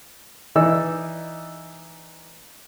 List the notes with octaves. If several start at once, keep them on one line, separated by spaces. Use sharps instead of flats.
E3 D#4 D5 E6